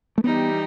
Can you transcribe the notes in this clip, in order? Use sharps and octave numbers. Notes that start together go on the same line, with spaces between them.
A3
E3 G3 B3 D#4 G4